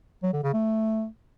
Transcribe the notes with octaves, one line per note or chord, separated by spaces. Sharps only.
F#3
D3
C#3
A3